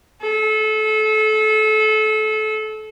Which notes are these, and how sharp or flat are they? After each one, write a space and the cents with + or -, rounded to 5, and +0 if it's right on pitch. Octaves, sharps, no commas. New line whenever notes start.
A4 -25